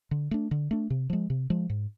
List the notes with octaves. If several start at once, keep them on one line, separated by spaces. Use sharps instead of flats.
D3
A3 D4
D3
A3 D4
C3
F3 G#3
C3
F3 G#3
G#2